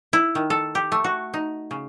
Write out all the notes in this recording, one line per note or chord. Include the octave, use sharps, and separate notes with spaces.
E4
D#3
A4
G4
A3
F#4
D#4
C#3